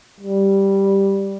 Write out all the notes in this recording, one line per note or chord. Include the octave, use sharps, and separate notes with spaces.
G3